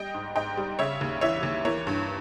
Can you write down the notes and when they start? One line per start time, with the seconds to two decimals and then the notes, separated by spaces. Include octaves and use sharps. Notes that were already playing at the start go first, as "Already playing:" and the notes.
Already playing: G3 D#5 G5
0.15 G#2
0.36 G#2 D#5 G5
0.57 G3
0.79 C#3 C#5 E5
1.01 D#2
1.21 E3 C#5 E5
1.43 D#2
1.65 E3 A#4 C#5
1.87 G2